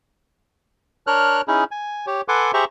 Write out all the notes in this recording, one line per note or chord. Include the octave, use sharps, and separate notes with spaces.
D4 A#4 C#5 F6 F#6
C#4 D#4 E4 G#4
G#5
G4 C#5
A4 B4 F#5 G#5 C6 D6
G4 G#4 C5 E5 A#5 C#6